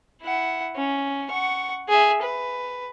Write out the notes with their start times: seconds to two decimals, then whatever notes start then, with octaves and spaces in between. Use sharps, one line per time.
0.22 E4 F#5
0.76 C#4
1.30 F#5 C#6
1.89 G#4 E5
2.23 B4